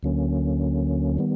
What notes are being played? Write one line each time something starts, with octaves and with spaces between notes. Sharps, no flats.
D2 D3 F#3 A#3 C#4
D#3 G3 B3